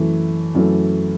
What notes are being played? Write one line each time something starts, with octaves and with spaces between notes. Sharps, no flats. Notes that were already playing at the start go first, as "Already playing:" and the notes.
Already playing: F#2 E3 A3
F#2 E3 A3